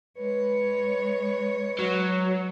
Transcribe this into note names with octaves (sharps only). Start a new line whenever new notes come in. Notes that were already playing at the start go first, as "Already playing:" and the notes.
G#3 B4 C#5
F#3